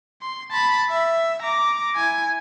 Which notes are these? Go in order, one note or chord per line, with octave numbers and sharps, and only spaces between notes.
C6
A5 B5
E5
A#5 D6
E4 G#5